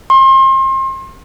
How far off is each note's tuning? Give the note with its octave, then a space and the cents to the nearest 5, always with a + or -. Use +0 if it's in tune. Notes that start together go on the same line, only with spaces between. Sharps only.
C6 +35